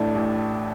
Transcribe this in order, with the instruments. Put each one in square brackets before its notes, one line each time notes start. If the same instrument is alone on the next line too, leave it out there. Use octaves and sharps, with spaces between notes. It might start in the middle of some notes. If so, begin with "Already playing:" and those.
Already playing: [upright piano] A1 A2 A3 D4
A1